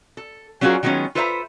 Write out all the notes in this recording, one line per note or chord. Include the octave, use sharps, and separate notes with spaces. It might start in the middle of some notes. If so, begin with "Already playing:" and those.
A4
F#3 C#4 F4 F#4 G#4 A#4
D#3 F#3 G#3 B3 C#4 F4
F4 A4 B4 C5 E5 A#5